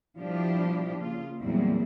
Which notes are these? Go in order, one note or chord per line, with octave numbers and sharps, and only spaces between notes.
B2 F3 G3 D4 E4 G4
C#3 A#3 F4
E2 A#2 F#3 G3 C4 E4